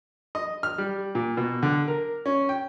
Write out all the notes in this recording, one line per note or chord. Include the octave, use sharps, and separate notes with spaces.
D#5
F6
G3
A#2
B2
D3
A#4
C#4
G5